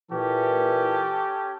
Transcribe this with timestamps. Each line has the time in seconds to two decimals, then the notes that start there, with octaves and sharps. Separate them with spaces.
0.12 A#2 E3 C#4 G4 A4